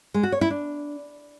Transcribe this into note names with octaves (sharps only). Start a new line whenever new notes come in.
G#3
F#4
C#5
E4
D4